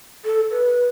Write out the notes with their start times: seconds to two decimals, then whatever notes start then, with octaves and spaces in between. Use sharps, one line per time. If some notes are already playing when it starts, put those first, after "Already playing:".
0.25 A4
0.51 B4